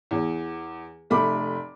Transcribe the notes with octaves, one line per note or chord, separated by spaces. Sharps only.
E2
F1 A3 B5 D6